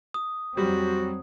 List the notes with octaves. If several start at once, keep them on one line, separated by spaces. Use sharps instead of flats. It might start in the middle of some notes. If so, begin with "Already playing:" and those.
D#6
F2 F#3 G3 C4 F#4